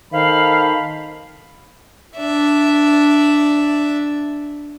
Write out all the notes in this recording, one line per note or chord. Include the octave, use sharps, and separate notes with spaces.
D#3 A4 C5 F5 B5
D4 E5